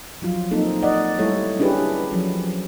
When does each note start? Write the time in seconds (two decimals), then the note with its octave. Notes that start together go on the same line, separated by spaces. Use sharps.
0.22 F3 F#3 F4
0.51 A#3 C4 D#4 A4
0.82 D5 D#5 F#5
1.19 G3 A3 E4 A4 C#5
1.59 C#4 D4 E4 G4 G#4 B4
2.12 F3 F#3 C#4